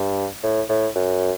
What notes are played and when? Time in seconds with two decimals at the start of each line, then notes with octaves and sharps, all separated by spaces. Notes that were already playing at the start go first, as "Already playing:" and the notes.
Already playing: G2
0.43 A2
0.69 A2
0.96 F#2